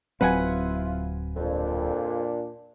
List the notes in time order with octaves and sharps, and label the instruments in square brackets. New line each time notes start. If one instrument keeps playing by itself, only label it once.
[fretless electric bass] D1 F#3 C4 [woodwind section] E4 F4 [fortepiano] B4 F#5 G#5
[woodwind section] F2 [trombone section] A#2 D4